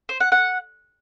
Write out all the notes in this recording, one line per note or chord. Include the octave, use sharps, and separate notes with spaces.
C5
F#5
F#5